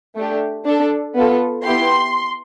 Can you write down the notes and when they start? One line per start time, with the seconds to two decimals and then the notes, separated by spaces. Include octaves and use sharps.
0.16 A3 D4 G4
0.65 D4 A4
1.15 B3 F4 A4
1.64 B3 E4 G4 C6